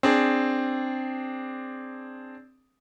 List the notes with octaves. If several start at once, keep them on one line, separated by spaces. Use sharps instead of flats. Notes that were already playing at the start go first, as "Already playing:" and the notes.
C4 D4 G#4